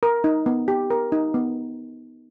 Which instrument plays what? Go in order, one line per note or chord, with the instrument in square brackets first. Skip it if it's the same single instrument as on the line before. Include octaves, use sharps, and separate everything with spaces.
[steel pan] A#4
D#4
B3
G4
A#4
D#4
B3